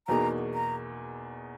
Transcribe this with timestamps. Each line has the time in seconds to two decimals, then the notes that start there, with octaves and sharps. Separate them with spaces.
0.08 E2 B2 A#3 D#4 G#4 A#5
0.54 A#5